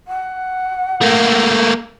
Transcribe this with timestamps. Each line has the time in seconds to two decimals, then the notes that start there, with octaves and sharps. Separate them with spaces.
0.08 F#5
1.02 A3 A#3